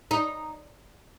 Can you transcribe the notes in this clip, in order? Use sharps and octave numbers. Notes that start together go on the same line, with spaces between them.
D#4